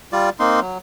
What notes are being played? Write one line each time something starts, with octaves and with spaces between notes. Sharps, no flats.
G3 F4 D5
A#3 C4 D#4 C6
F#3